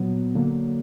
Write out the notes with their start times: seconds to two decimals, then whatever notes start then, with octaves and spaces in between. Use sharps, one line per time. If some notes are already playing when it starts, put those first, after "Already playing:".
Already playing: A#2 F#3 B3
0.35 D3 F#3 A#3